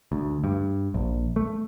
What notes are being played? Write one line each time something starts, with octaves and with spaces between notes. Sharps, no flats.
D2
G2
A#1
A3